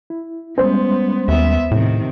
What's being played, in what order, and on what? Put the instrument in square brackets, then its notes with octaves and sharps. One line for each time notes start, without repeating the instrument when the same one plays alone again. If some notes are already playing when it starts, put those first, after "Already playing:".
[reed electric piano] E4
[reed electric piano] G3 G#3 C#4 [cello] B3 [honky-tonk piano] C5
[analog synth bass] D#2 [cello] B3 E5
[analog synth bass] A2 [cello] C3 D#3